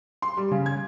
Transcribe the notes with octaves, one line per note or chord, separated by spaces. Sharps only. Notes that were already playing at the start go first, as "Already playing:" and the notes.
C6
G3
C#3
G#6